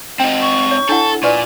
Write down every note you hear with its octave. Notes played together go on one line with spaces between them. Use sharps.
C4 D#4 G5
C#6
C#5
D4 E4 A4 F#5
A#2 B4 D5 G#5 C#6